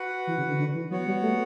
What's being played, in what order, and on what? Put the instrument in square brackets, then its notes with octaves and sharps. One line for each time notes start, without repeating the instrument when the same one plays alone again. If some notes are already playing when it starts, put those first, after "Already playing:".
Already playing: [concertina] F#4 B4 F#5
[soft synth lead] E3
C#3
D3
D3
E3
[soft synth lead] F#3 [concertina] B3 F#4 C#5 F#5
[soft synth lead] G3
A3